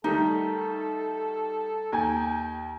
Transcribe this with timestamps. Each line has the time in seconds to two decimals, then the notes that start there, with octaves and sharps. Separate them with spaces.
0.04 D#3 G3 A3 D#4 A4
1.92 D#2 G5 G#5 A#5